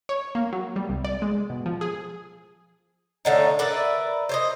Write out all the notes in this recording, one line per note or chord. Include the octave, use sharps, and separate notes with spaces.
C#5
A#3
F#3
G3
C2
D5
G#3
B2
F3
G#4
A2 D3 D#4
A#4 B4 D5 E5
C5 C#5 D#5